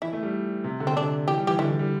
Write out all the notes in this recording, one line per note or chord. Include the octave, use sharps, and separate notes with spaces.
E3 E4
A3
G3
C3
D3
C4
D3 D4
E3 G4
G3
E3 G4
D3 E4
E3
G3